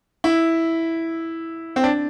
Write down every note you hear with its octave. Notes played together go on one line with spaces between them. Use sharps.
E4
C4
D4